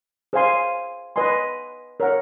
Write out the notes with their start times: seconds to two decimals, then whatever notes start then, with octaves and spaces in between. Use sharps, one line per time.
0.33 G#4 C5 F5 G#5 C6
1.16 B4 D#5 G#5 C6
2.00 A#4 C#5 F#5